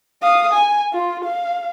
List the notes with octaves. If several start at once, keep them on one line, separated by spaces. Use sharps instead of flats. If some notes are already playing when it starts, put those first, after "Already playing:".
F5 D#6
G#5
F4
F5